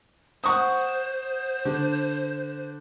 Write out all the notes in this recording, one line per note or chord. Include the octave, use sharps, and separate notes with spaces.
C5 F#5 C#6 D#6
D3